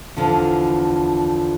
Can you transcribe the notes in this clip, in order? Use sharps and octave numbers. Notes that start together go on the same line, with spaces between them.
E2 D3 F3